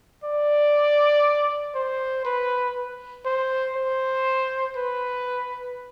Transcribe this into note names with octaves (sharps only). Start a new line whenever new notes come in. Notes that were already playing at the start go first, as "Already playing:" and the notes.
D5
C5
B4
C5
C5
B4